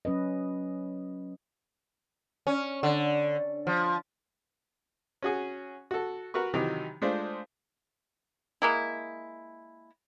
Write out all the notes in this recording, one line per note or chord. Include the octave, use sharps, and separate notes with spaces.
F#3 C#4 B4 D#5
C#4
D3
F3
C#4 F#4 G#4
F#4 A4
F#4 A#4 B4 C#6
C3 D#3 E3 F#3 D#4 G4
G#3 A3 D4 F4 C5
G#3 A#3 E4